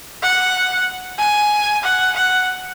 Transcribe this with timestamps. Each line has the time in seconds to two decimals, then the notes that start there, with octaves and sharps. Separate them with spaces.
0.23 F#5
1.19 G#5
1.84 F#5
2.16 F#5